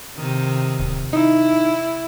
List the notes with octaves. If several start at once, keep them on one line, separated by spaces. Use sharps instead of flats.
C3 D#3
D1
D#4 E4